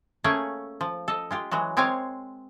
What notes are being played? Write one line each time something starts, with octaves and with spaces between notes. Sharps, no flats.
A3 A#3 C#4 G#4 C#5 G5
F3
A4 D#5
G#3 F4 G4
E3 F#3 G#3 F#4
G#3 C4 A#4 C#5 F5 G#5